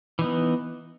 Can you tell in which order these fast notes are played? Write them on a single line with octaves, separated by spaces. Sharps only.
E3 D#4 B3